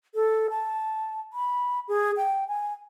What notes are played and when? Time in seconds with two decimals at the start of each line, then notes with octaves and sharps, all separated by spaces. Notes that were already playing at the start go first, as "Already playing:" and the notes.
0.15 A4
0.50 A5
1.33 B5
1.88 G#4
2.17 G5
2.48 G#5